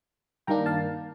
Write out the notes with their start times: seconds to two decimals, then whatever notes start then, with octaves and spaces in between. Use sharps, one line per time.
0.47 G2 D#3 A#3 D4 G5 A#5
0.66 F5 A5